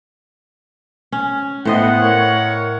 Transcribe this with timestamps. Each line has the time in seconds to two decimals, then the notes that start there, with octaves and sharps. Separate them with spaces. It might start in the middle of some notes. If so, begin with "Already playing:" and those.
1.12 C#4
1.65 A2 B3 C5 D#5 F#5
2.00 A#4 C#5